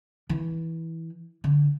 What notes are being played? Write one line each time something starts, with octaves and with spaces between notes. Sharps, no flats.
E3
D3